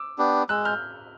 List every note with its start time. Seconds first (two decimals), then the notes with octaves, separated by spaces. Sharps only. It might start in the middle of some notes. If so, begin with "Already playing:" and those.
Already playing: D6 E6
0.18 B3 D4 G4
0.49 G#3 E6 F#6
0.65 F6 G6